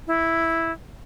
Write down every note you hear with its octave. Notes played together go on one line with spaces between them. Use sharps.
E4